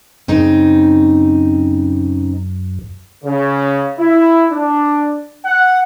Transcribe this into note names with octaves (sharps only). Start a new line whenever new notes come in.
F#2 C#3 C4 D#4
C#3
E4
D4
F#5